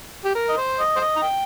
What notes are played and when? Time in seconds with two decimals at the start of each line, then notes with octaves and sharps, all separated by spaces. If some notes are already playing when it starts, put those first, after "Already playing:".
0.24 G4
0.35 A#4
0.49 D#5
0.57 C5
0.79 D#5
0.96 C5
1.01 D#5
1.16 A#5
1.23 G5